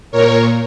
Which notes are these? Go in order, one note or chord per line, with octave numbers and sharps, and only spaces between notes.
A#2 A#4 C#5